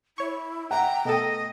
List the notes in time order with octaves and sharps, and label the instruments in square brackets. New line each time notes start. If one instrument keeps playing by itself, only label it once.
[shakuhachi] E4 [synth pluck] C#5 C#6
[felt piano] E5 F#5 [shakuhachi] G5 [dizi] A#5
[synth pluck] B2 A4 [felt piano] A3 [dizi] D#5